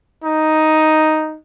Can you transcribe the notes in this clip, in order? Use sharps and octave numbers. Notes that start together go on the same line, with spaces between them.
D#4